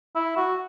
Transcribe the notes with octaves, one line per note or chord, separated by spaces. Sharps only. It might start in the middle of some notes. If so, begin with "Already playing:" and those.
E4
F#4